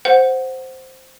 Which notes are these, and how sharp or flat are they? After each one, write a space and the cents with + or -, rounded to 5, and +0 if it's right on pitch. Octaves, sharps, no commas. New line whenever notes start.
C5 +0 F#5 +0